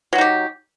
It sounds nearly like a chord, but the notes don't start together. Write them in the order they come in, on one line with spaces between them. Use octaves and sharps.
F#3 F#4 D#4 G4